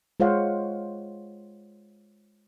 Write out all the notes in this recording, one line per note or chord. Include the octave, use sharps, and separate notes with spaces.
G#3 F4 C5 C#5 F5 F#5